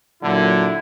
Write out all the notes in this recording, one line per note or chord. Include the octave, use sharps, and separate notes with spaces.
A#2 D3 F#3 E4